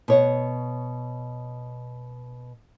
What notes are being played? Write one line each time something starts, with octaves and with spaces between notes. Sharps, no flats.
B2 C#5 F#5